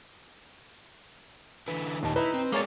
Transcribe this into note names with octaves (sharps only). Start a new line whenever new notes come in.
D3 E3 B4
D#2 A#2 D#5 A5
D#4 E4 B4
C4
G#3 A#3 G#4 C#5 D5 A5